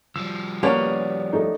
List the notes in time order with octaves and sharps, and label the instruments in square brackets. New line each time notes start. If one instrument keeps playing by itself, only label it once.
[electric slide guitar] F3 G3 [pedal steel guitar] E6
[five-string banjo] A#3 B3 C#4 [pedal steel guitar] G4 D5 A#5
[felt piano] A3 D#4